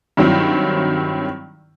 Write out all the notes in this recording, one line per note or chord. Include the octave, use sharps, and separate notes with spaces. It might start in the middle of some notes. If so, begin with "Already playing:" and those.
G2 D#3 F#3 C4 E4